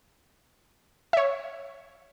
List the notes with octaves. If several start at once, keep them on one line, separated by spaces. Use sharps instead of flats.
C#5 E5